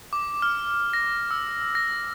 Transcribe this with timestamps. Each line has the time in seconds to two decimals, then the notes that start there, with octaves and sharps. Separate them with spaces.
0.13 D6
0.42 F6
0.93 A#6
1.31 E6
1.75 A#6